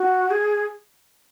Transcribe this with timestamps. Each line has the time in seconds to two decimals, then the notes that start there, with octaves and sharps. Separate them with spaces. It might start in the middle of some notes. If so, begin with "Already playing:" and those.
Already playing: F#4
0.30 G#4